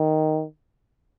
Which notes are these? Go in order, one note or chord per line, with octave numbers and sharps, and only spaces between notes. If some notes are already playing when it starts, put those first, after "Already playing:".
Already playing: D#3